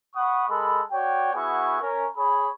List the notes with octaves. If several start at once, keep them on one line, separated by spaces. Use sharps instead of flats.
F#5 B5 C#6 D#6
G#3 A4 A#4 B5
F#4 C#5 D5 G5
B3 E4 F#4 G#4 C#6
C#4 A#4
G#4 C#5 B5